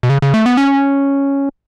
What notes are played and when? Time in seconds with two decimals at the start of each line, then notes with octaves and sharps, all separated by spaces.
0.03 B2
0.10 C#3
0.22 C#3
0.34 A3
0.46 B3
0.57 C#4